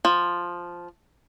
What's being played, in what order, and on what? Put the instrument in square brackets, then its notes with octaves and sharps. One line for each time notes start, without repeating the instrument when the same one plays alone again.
[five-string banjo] F3